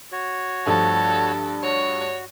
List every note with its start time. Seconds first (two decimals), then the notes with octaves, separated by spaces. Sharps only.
0.12 F#4 C#5
0.66 G2 F3 A3 A4
1.63 F#4 C#5